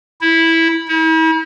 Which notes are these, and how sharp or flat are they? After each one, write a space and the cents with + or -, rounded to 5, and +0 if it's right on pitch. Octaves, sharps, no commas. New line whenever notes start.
E4 -10
E4 -40